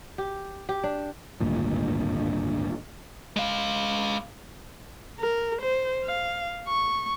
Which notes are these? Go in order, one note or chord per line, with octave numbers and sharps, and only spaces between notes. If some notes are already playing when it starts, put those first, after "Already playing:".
G4
G4
D4
G#1 D2 G2 A#2
G#3 F5
A#4
C5
F5
C#6